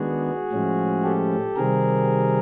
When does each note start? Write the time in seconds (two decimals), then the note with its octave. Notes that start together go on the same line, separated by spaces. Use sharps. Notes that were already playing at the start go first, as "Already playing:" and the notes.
Already playing: D#3 G#3 B3 D4 F#4 G#4
0.52 A2 F3 G#3 C#4
1.04 G4 A4
1.56 C3 D#3 G3 C4 G#4 A#4